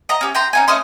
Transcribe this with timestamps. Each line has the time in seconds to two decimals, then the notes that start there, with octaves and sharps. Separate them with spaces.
0.09 D#5 A#5
0.21 C#4 G4
0.35 G5 A#5 C6
0.53 C#4 D#4 G#5
0.68 A3 C#4 D#5 C6